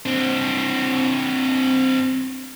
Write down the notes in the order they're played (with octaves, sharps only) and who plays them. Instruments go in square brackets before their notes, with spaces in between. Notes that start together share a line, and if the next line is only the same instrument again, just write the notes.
[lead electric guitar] C4 D4